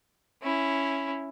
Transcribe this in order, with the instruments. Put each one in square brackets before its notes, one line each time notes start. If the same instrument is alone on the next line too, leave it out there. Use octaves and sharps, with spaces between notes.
[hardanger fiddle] C#4 E4